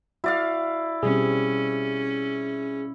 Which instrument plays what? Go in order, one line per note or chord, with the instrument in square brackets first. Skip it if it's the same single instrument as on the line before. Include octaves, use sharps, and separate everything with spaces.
[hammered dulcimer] E4 D5 F5 [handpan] F#4
[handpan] B2 G3 C4 [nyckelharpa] C#4 [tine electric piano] G#4